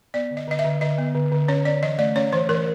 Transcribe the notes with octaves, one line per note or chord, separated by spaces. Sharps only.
B3 D5
D3
D#5
D3 D#5
E5
D3
D3 D#5
B3
D3
D3
C#4 C#5
C#4 D5
E3 D#5
A3 D5
C#4 C#5
E3 C5
E3 A#4